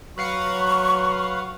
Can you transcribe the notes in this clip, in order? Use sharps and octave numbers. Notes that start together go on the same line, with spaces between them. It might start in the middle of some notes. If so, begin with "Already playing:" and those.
F#3 B4 F5 F#5 C#6